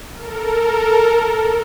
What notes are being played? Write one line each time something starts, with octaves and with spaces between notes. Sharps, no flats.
A4 A#4